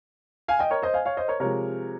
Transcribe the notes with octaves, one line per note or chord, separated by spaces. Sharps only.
F5 G#5
D#5 G5
A#4 C#5
C5 D#5
F5 G#5
C#5 F5
C5 D#5
A#4 C#5
C3 F3 G#3 A#4 C#5